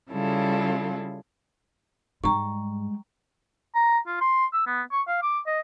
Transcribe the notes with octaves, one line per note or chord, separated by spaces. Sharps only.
C#3 G3 E4 F4 A4
G#2 G3 G#3 G5 A#5 C#6
A#5
F4
C6
E6
B3
C#6
F5
D6
D#5